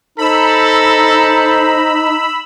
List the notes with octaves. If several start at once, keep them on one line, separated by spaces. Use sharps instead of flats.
D#4 A4 C5 A#5 B5 E6